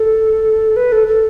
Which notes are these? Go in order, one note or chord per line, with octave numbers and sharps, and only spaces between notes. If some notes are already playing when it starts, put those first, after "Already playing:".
Already playing: A4
B4
A4
A4